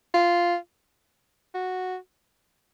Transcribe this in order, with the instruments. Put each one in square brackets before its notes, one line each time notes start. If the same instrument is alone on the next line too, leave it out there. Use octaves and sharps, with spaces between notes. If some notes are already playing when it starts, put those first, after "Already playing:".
[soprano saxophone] F4
F#4